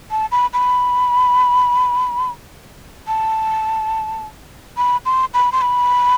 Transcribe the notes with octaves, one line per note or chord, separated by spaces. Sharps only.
A5
B5
B5
A5
B5
C6
B5
C6
B5